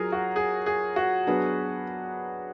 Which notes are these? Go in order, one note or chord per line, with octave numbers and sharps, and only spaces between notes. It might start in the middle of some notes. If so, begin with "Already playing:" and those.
Already playing: F#3 F4 G#4 A#4
F#4
G#4
G#4
F#4
F#3 B3 D4 G#4 B4